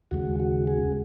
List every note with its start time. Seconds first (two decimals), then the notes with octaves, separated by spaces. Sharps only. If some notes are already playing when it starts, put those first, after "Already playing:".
0.11 D#2 C#3 G#3 F#4
0.40 F#4
0.67 G#4